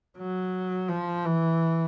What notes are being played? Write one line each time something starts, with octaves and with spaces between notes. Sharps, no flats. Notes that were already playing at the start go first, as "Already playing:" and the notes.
F#3
F3
E3